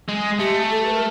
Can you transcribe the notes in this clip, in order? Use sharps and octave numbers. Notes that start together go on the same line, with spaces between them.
G#3
A3 G4
A4
B4
A#4